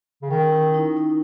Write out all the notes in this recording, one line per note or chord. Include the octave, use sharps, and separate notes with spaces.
C#3
D#3 C#4
E4
D#4
D#4